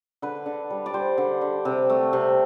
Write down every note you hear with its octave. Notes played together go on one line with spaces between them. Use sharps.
D3 B4
D3
G3
D5
G3 C5
D3
D3
C3
A3
C3